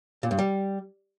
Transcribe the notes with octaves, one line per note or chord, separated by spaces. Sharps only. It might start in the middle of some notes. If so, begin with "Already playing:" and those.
A#2
G2
G3